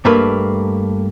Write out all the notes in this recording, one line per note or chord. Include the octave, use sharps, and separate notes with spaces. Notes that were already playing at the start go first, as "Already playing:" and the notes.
G2 A3 A#3 A#4 B4